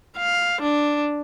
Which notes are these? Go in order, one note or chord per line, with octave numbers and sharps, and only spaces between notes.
F5
D4